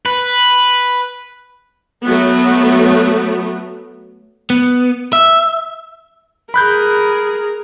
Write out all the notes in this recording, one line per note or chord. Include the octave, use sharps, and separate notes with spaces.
B4
F#3 A3 B3
B3
E5
G#4 A#4 B5 F#6 G6